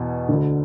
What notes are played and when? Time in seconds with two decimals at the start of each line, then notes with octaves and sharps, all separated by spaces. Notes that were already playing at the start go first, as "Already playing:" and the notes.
Already playing: E2 B2
0.29 D2 D3